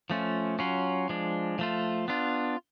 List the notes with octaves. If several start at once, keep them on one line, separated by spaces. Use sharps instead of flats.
F3 A3 C#4 F4
F#3 C#4 F4
F3 G#3 D4
F3 A3 F4
B3 D4 F4